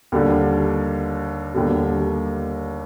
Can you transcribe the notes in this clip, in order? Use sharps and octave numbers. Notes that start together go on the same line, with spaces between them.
D#2 D3 G3
D#2 D3 G3